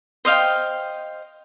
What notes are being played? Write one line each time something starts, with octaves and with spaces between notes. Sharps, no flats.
C5 D#5 F5 G5